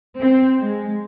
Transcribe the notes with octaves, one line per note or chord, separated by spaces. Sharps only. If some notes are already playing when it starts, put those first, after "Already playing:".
C4
G#3